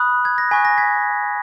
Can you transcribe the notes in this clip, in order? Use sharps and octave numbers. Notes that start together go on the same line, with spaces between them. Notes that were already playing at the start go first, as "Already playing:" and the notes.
Already playing: B5 D#6 F#6
G#6
A#6
G#5 C#6 F#6 G#6 B6
A#6
G#6 B6